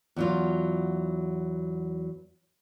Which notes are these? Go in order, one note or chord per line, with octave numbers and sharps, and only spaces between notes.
E2 F#3 F4